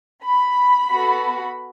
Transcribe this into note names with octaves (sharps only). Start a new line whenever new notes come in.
B5
B3 F#4 A4